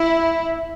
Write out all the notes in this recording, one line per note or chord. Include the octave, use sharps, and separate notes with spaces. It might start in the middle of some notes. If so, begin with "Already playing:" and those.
Already playing: E4